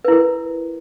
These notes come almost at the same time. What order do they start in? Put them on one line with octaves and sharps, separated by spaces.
B4 E4 A#4